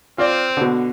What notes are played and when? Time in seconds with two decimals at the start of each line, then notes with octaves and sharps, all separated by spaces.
0.18 C4 F4 D5
0.57 B2 D3